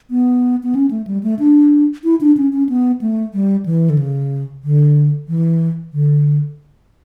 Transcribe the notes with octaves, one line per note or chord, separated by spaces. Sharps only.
B3
B3
C#4
A3
G3
A3
D4
E4
D4
C#4
C#4
B3
A3
G3
E3
D3
C#3
D3
E3
D3